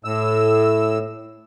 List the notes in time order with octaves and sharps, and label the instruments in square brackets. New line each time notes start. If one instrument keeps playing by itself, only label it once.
[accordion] A2 E6